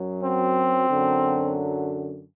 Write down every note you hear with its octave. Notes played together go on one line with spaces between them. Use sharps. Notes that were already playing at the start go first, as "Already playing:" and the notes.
Already playing: F#2 F#3
C4
F#2 D3 F#3